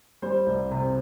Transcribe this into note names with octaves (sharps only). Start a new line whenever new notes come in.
G3 C5
C2
C3